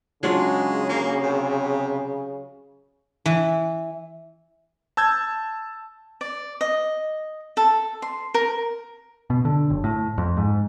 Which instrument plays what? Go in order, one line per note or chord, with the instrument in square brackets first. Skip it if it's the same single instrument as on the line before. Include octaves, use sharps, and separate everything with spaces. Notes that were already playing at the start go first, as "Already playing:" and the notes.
[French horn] C#3 [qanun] F#3 D4 F4 [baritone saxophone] G#3
[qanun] F#3 [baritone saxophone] A#3
[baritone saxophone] C3
[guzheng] E3
[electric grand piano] A5 E6 G6 G#6
[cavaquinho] D5
D#5
A4
C6
A#4
[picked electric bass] B2
D3
F#1
A2
F2
G#2